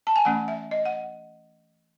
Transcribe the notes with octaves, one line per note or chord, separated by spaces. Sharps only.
A5
G#5
E3 A3 C#4 F#5
E5
D#5
F#5